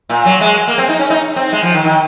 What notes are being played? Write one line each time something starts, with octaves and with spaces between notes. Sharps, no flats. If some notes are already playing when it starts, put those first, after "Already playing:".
A#2
F#3
G#3
A#3
C4
D#4
C#4
D#4
C4
G#3
F3
D#3
D#3